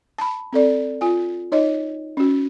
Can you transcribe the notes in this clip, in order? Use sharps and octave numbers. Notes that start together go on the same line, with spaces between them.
A5 B5
C4 A4 D5
F4 G#5
D#4 C#5 D#5
C#4 F#4